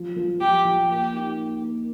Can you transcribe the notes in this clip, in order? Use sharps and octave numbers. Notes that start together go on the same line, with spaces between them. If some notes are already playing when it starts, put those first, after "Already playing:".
Already playing: F3
F3
F3 G4
F3
A#3 G4
D#4
A#3
A#3